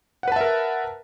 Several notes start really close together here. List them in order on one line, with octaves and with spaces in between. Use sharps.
F#5 B4 A5 E5 A#4